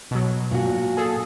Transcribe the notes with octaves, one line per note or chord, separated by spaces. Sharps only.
B2 F#3
A#2 D4 F#4
G#4 A4